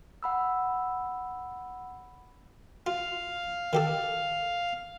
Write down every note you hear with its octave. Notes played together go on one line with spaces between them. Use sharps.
F#5 B5 E6
F4 F5
D#3 G4 A4